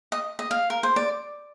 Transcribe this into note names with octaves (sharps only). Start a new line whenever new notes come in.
D#5
D#5
F5
A#4
C5
D5